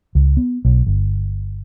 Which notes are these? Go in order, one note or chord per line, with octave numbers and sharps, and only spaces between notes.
C#2
B3
B1
G1